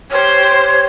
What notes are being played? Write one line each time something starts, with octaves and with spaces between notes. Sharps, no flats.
G4 C5 C#5 C6